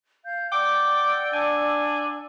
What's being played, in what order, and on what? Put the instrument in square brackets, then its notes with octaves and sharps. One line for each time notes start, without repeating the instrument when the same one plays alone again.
[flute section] F5 G6
[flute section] D5 F#5 E6 [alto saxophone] G5 [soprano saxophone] D6
[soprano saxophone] D4 [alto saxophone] G#5